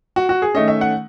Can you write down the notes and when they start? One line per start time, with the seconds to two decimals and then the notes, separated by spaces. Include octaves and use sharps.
0.16 F#4
0.29 F#4
0.42 G#4
0.54 D#3 A3 C#4 D#5
0.68 E5
0.81 F#5